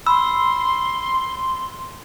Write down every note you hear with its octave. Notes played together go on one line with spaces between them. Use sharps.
B5 C6 E6